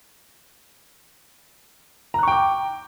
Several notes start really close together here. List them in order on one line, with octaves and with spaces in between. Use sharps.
A#5 F#6 C#6 G5 D6